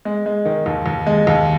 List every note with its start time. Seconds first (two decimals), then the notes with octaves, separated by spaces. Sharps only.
0.05 G#3
0.26 G#3
0.45 D#3
0.66 D#2
0.86 D#2
1.07 G#3
1.27 D#2